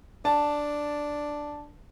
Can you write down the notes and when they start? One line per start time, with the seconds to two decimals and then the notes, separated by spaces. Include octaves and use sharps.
0.25 D4 A5